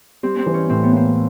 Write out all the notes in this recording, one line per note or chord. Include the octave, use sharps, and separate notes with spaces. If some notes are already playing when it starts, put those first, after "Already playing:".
G3 C4
C4
E3
C#4
A2 C4
B3
A#3 C4